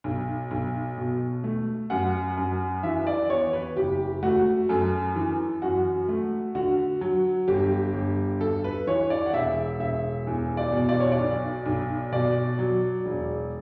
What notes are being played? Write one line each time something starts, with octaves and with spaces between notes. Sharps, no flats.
B1
B1
B2
A3
F#2 F#5
F#2
E3 E5
D5
B3 C#5
B4
F#1 G4
A3 F#4
F#2 A4
E3
F#2 F#4
A3
D3 F#4
F#3
G1 G4
G1
G2 A4
B4
E3 C#5
D5
F#5
E1 E5
E1 E5
E2
D5
B2
D5
C#5
D5
B1
B1
B2 D5
F#3
E1